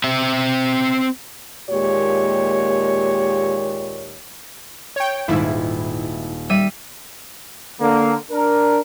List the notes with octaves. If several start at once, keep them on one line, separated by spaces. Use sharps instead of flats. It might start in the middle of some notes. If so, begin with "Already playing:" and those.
C4 E5
D#2 A#2 G#3 G4 C#5
C#5 G5
D#1 G#2 E4
G3 E5 D#7
D3 A#3
D4 A#4